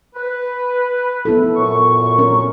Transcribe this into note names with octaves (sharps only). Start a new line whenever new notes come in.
B4
B3 E4 A4
F#2 A#2 C#6
C#4 A#4